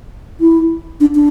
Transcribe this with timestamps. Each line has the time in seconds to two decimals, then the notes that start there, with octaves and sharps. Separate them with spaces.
0.40 E4
1.00 D4
1.15 D4